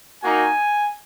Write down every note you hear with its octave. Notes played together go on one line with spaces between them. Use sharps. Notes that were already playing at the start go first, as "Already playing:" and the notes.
A#3 D#4 F#4 G#5